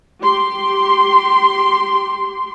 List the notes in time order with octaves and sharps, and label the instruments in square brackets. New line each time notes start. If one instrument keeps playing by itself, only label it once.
[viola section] G4 C6